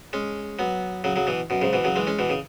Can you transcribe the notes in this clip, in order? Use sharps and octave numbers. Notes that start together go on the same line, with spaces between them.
G#3 C#4
F#3 B3
C#3 F#3
C#3 F#3
B2 E3
F#2 B2
G#2 C#3
B2 E3
C#3 F#3
E3 G#3
G#3 C#4
B2 E3
C#3